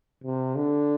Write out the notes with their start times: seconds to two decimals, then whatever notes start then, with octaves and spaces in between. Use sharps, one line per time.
0.24 C3
0.56 D3